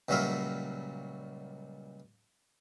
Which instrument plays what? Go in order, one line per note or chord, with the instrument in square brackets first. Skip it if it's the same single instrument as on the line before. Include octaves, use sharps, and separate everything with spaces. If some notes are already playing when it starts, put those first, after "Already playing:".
[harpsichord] C#2 A#2 F#3 G3 E5 F5